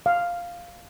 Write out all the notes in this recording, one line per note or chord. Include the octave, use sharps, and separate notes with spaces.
F5